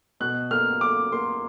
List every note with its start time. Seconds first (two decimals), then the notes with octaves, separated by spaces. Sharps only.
0.20 B2 F#6
0.51 A#3 F6
0.81 A#3 D6
1.12 A#3 C6